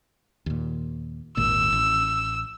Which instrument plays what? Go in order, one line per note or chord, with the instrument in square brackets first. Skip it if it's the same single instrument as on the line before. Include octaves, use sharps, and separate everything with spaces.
[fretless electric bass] D#2 A#2
[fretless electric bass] G#1 D#2 A#2 [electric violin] E6
[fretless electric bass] A1